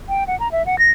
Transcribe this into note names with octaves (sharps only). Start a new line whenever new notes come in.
G5
F#5
A#5
E5
F#5
A#6